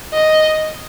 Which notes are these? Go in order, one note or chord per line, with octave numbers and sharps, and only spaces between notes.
D#5